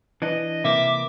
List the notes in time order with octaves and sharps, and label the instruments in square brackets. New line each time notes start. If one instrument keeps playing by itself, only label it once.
[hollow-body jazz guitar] E3 D4 [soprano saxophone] D#5
[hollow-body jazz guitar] C3 E3 A#3 [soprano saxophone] E5 [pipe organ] D6